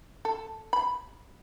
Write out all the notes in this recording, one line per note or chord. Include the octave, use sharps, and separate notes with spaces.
A4
B5